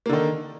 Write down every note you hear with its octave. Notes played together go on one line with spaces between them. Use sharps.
D3 D#3 A#3